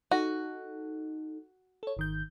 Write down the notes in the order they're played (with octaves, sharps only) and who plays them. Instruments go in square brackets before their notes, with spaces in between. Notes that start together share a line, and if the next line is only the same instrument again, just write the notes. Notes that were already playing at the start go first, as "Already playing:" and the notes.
[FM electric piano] D#4 A4 [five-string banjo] F#4
[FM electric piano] A4 C#5
G#1 D#3 G6